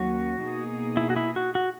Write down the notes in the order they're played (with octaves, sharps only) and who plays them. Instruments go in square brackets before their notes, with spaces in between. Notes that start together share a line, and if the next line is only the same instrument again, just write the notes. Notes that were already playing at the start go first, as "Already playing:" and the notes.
Already playing: [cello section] D#2 D#3 F#3 C#4 [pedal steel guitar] F#4
[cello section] B2 A#3 D#4 G#4
[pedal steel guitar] E4
F#4
E4
F#4
F#4